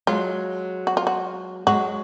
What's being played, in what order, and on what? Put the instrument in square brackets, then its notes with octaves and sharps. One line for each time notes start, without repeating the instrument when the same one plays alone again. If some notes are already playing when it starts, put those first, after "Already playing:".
[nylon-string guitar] F#3 G#3 [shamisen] F4
[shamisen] F#4
F4
F#4
[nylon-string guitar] F#3 G#3 [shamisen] F#4